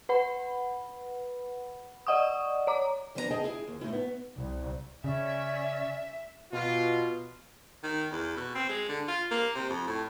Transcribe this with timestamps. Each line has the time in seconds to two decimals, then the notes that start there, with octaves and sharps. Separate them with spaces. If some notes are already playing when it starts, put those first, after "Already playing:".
0.09 B4 F#5 B5
2.07 D5 D#5 F#5 C#6 D#6
2.67 C#5 A#5 D6
3.15 F2 F#3 B3 D4 A4 A#5
3.31 G#4 D#5 G5 A5
3.44 E4 G#4
3.67 D#2
3.81 A2 A3 D#4 E4
3.93 B3
4.36 C2
5.04 C#3 C#4 D5 E5
6.53 B2 F4
7.83 D#3
8.11 E2
8.37 B2
8.55 C4
8.69 G#3
8.88 D3
9.08 F4
9.31 A#3
9.55 C3
9.70 F2
9.87 A2